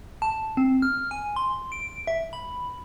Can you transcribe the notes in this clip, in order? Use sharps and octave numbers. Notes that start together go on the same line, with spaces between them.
A5
C4
F6
G#5
C6
D7
E5
B5